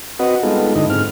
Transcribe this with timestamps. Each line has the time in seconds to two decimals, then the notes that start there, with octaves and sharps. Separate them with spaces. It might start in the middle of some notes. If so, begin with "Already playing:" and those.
0.19 C4 F#4 B4 D#5 F#5
0.43 G3 G#3 B3 D#4 F4 A4
0.75 G2 D3 E4 D#5
0.90 G#2 C4 F6